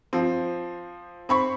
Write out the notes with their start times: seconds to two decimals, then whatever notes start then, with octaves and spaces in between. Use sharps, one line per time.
0.13 F3 C4
1.29 C4 B5 C#6